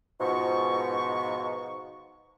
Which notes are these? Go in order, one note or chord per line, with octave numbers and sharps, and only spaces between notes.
G#2 B2 F3 C#6